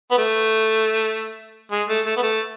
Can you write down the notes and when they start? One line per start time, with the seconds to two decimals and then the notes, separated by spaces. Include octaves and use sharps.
0.11 B3
0.18 A3
1.71 G#3
1.89 A3
2.06 A3
2.17 B3
2.22 A3